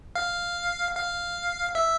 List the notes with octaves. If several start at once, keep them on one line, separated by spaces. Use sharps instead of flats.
F5
F5
E5